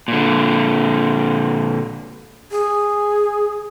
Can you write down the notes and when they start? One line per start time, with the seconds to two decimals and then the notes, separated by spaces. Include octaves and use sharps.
0.08 A#2 D3
2.51 G#4